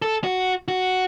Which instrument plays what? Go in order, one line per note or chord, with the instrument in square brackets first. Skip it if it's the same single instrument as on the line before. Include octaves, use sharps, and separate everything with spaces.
[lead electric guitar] A4
F#4
F#4